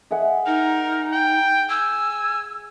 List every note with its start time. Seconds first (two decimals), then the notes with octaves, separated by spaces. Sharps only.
0.11 G#4 E5 F#5
0.46 D#4 A#4
1.12 G5
1.69 G#5 E6